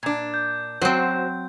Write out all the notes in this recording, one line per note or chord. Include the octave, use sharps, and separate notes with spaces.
A#2 D4
G6
F#3 C4 F#4 C5